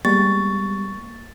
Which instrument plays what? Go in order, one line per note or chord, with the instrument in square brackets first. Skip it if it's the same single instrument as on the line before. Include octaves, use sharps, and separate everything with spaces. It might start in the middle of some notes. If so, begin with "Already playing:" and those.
[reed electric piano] G3 G#3 B3 [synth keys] A#3 [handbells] C#6 [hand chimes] A6